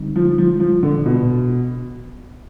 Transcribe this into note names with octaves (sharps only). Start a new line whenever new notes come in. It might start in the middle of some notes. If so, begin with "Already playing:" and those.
Already playing: D3 G3 C4 D#4
F3
F3
F3
D3
B2